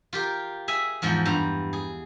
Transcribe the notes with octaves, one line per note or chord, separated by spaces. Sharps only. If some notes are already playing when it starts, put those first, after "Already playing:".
F4 G4 A#4
G#4 E5 G#5
E2 G#2 F3 F#5
G2 A#5
G#4